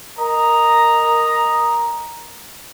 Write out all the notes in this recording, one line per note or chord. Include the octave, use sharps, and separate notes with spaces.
A#4 D#5 A#5